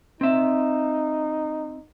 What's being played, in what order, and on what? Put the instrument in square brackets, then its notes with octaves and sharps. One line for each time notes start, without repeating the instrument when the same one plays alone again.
[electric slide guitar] C4 E5 [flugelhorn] D#4